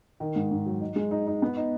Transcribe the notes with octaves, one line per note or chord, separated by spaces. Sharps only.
D#3
G#2
G#2
F#3
D#4
G#3
D#4
D#4
B3
D#4